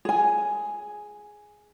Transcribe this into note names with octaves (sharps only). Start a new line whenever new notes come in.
G#4 G#5